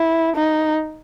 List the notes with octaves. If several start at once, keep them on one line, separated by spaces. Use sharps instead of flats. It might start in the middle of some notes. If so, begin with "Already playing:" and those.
Already playing: E4
D#4